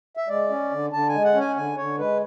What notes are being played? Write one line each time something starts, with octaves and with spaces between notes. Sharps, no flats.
E5
G#3 D5
C#4
D3
D3 A5
G#5
G#3
F#5
C#4
G#5
D3 G#5
D3 C#5
G#3 B4